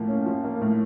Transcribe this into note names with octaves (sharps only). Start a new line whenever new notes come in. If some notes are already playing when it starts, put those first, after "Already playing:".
Already playing: A2 F3 A#3
C#4
F3
A#3
A2